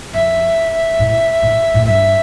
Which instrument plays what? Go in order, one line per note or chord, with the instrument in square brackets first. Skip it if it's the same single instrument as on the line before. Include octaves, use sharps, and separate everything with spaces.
[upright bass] F2 [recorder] E5
[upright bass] A2
A2
A2
[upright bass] G2 [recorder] E5